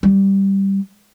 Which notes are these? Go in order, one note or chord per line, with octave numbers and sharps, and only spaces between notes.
G3